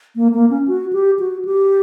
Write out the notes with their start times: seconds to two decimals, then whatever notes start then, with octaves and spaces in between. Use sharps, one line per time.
0.16 A#3
0.34 A#3
0.50 C#4
0.68 F#4
0.93 G4
1.19 F#4
1.45 G4